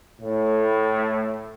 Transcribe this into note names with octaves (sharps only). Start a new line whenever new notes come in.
A2